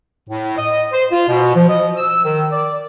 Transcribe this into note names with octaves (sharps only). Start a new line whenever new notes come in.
A2
D#5
C5
F4
B2
F3
D#5
E6
D#3
D5